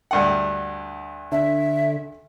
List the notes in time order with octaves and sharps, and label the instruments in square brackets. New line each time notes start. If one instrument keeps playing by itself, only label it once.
[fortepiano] D2 G2 F#5
[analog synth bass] D3 [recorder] E5